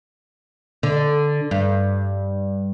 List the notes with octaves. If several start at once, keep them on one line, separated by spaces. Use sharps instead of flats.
D3
G2